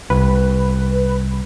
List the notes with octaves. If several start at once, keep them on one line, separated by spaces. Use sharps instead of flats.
C2 B4